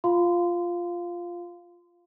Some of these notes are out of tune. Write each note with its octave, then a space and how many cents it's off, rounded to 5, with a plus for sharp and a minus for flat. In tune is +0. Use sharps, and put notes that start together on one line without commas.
F4 +0 F5 +0 C6 -25